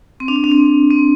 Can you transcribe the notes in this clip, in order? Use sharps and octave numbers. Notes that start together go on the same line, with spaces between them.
C4
D4
C4
D4
C4
C4